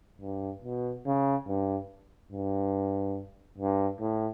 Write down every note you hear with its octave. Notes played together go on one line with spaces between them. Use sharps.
G2
B2
C#3
G2
G2
G2
A2